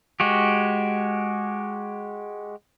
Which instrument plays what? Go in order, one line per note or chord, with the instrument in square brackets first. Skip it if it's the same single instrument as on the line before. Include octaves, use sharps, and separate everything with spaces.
[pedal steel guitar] G#3 F#4 G4